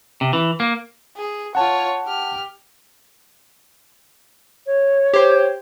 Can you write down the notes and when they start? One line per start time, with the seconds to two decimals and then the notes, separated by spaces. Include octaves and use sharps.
0.21 C3
0.33 E3
0.60 A#3
1.17 G#4
1.55 F4 C#5 F#5 A5
2.05 G4 F6
4.67 C#5
5.14 G4 C5